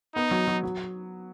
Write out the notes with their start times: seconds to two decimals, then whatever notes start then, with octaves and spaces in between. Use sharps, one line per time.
0.15 B3 D#4
0.31 F#3
0.47 F#3
0.63 F#3